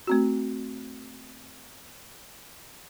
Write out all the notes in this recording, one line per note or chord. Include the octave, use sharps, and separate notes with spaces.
A3 C4 F#4